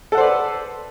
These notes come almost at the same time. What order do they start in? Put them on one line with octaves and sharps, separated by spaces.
A4 F#5 C5 D5 B4